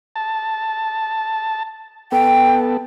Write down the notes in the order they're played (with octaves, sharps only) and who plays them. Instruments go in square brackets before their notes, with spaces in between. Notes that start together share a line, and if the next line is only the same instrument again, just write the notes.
[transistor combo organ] A5
[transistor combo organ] B3 A4 [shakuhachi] G5